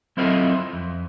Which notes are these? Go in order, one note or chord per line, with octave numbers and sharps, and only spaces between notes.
F#3 C4 E4 F4 A4 D#5
F2